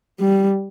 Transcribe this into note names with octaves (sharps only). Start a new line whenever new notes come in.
G3